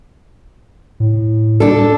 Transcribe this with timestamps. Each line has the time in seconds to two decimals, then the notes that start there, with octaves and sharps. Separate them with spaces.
1.00 A2
1.60 D4 A4